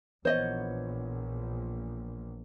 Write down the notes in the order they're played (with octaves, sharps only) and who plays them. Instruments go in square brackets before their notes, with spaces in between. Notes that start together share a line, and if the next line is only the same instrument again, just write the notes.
[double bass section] A#1 [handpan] E3 B3 C#5 [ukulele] C5 D#5